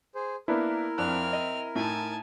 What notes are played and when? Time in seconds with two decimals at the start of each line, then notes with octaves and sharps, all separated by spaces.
0.15 G#4 C5
0.48 A#3 B3 D4 E4 A#4
0.98 F2 C4 D4 F6 F#6
1.33 D#5
1.75 A2 D#4 G#5 A5